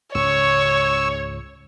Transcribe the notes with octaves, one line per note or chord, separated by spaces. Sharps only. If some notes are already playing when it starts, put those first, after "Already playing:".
C#2 G#2 C#3 C#5 C#6 E6